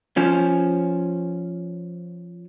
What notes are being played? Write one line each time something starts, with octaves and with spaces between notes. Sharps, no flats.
F3 C#4